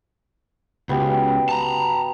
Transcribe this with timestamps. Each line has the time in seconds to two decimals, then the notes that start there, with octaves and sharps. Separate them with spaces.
0.89 C#2 B3 F#4 G4
1.49 A5 A#5